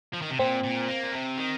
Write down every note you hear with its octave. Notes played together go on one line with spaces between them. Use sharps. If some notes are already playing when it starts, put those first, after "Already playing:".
F3
D#3
C3
A#2 C4
A#2
A#3
A#2
C3
D#3